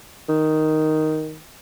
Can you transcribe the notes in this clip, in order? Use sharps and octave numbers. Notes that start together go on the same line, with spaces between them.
D#3